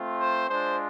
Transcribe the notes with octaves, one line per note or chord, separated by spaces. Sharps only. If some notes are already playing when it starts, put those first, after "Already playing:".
Already playing: A3 C4 F4
C5
G#3 D4 F4 C5